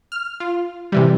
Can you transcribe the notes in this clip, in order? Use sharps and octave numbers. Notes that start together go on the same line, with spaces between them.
F6
F4
C3 E3 G3